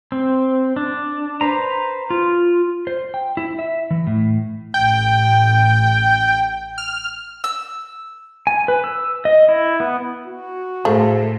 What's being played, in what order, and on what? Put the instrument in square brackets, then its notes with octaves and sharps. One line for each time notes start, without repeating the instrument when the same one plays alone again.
[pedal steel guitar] C4
D4
B4 C5 A#5
F4
[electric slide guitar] C5
G5
E4
E5
E3
A2
[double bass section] A1 [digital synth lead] G5
[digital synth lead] F6
[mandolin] E6
[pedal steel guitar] G#5
B4
E6
D#5
E4
B3
[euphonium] F#4
[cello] A2 [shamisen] A3 [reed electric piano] G#4 C5 F5